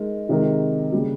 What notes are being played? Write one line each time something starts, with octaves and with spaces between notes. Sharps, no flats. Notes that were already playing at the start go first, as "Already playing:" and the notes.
Already playing: G#3 D#4 A#4
C3 D#3 G#3 D#4 A#4
C#3 G3 A#3